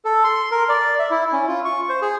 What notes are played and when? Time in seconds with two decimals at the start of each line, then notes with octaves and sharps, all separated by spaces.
0.05 A4
0.24 C6
0.51 A#4
0.69 D5
0.99 E5
1.11 E4
1.33 C#4
1.48 F4
1.65 C#6
1.89 C5
2.02 G#4